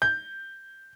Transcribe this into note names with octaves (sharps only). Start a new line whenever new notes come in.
G6